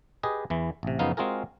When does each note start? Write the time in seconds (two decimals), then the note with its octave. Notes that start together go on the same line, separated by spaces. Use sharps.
0.23 G4 G#4 B4 D#5
0.50 E2 E3
0.83 A1 C3
0.99 F#2 C#3 F3 B3 D#4 F5
1.17 G#3 C4 F4 F#4 G#4 A#4